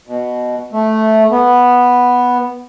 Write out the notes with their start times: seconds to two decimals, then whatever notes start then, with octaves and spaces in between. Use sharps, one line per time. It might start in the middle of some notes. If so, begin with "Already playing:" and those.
0.07 B2
0.72 A3
1.31 B3